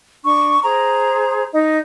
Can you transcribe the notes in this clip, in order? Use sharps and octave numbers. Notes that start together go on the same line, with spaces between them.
D4 C#6
G#4 C5 A#5
D#4 D#5